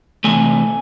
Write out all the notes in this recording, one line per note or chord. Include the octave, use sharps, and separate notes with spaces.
C3 E3 A3 G#5